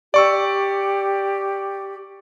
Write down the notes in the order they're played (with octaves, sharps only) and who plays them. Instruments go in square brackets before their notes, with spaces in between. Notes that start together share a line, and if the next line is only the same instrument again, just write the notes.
[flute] G4 [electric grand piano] D5 C#6 E6